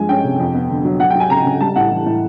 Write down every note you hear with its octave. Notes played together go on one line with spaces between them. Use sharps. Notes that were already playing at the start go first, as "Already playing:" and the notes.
Already playing: G2 F3 G#3 G#5
C#4 G5
C3
F2
B3
D3
F#3
F#3 F#5
G5
F#3 G#5
C#3 A#5
C#3
G3 A5
A2 F#5
E3
A2